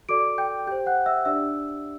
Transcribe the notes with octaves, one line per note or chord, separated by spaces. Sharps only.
F#4 A4 D5 D6 D7
G5 G6
G4 C5 G5 G6
F#5 F#6
E5 E6
D4 G4 D5 E5 E6